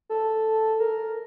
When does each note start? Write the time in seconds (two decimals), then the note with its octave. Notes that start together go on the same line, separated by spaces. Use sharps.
0.10 A4
0.80 A#4